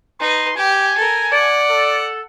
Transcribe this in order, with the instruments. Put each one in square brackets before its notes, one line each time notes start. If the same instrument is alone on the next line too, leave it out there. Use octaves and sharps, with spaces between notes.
[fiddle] D#4 B4 [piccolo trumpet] C6
[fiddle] G4 [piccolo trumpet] G#5
[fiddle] A4 A#4
[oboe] D5 [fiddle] F#5
[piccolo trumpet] A4